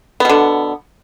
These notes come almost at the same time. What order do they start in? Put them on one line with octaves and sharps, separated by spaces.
B3 B2 D3